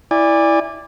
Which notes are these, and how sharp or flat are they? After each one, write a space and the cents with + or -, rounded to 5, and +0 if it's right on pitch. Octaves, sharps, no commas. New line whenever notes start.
E4 -5 D5 +0 G#5 -30